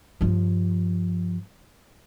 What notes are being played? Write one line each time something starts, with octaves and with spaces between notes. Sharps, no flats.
G2 F3